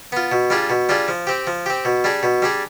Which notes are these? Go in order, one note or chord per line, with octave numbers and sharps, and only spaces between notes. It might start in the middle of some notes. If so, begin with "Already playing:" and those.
B3 F4
B2
G3 D4 F4 G#4
B2
G3 D4 F4 G#4
F3
C4 G4
F3
C4 G4
B2
G3 D4 G#4
B2
G3 D4 G#4